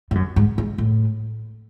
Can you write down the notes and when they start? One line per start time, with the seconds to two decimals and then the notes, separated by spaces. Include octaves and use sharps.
0.11 G#2
0.15 F#2
0.36 G#2
0.58 G#2
0.78 A2